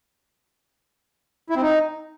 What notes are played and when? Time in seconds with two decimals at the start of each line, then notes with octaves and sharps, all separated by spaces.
1.50 E4
1.56 C4
1.62 D#4